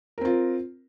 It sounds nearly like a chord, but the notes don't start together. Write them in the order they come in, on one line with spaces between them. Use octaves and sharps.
A#4 C4 F4